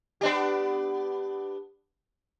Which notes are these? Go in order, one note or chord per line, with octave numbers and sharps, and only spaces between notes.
B3 D4 G4